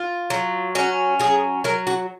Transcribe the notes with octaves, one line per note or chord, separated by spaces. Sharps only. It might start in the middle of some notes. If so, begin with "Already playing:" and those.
Already playing: F4
F#3
C#4 F#4
F#3 G#4
F#3 A#4
F#4